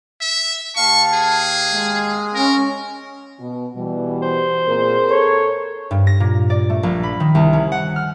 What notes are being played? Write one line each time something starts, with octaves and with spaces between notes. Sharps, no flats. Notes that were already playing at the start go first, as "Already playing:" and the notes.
E5
D#2 F5 A5 C#6
G#4
G#3
C#4 A#4
B2
B2 E3 G3
C5
A#2 C4 G#4 A#4
A4 C#5
G2
A#6
A#2
D5
A3
A#1
B5
D#3
C2
C#4
F#5
F6